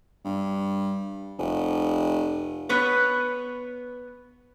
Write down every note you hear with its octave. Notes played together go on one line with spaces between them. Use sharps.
G2
F1
B3 B4 C#5